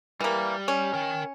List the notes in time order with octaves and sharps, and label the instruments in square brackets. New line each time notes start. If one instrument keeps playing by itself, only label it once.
[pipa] E3 A#3 [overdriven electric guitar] G3
[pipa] C#4
[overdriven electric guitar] A#4 G5